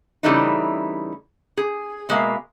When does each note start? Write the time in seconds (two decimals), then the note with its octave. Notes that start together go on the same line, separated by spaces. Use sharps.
0.23 C#3 E3 G3 A3 D4 D#4
1.57 G#4
2.09 B2 G#3 A#3 C5 E5 F5